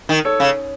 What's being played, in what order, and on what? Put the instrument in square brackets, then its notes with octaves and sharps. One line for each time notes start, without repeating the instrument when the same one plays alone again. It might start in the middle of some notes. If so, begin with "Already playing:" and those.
[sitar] D#3
[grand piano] A4 C#5
[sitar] C#3